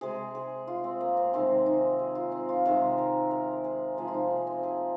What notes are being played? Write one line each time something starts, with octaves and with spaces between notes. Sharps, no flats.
C3 G#3 G#4
G#4
F4
C4
A#3
C4
C3 D#3 G#3 C4
D#4
G#4
F4
C4
F4
C3 D#3 G#3
A#4
A#4
G#4
C3 F3 G#3 G#4
F4
D#4
A#3
C4
G#4